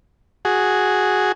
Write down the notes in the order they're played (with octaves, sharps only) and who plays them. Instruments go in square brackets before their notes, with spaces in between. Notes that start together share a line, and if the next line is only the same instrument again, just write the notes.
[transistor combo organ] F#4 G#4